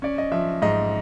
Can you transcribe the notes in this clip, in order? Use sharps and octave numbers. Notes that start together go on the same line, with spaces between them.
C#4 D5
D#5
F3 E5
G#2 D#5